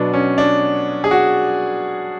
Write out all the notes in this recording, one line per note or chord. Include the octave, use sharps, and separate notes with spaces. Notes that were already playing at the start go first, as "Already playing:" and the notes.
Already playing: B2 F#3 B3 D4
C#4
D4
G#4
F#4